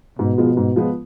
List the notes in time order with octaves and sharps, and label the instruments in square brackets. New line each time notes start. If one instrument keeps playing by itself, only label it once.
[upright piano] G#2 [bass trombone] B2
[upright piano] F3 G#3 B3 F4
G#2
F3 G#3 B3 F4